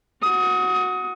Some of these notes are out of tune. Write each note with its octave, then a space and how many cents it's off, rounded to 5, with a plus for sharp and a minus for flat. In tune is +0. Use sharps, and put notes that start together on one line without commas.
F#4 -15 D#6 +25